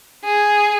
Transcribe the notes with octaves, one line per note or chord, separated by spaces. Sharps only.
G#4